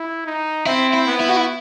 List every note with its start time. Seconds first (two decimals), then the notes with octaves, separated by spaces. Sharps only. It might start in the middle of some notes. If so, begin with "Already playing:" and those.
Already playing: E4
0.26 D#4
0.66 C4 E4
0.93 E4
1.07 B3
1.20 E4
1.29 F#4
1.37 E4